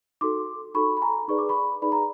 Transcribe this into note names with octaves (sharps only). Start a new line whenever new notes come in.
D#4 F#4 A4 C6 D6
D#4 F#4 A4 B5 C#6
B5
G#5 A#5
D#4 G#4 B4 D5 C#6
D6
B5 C#6
D#4 G#4 B4 D5 B5
A#5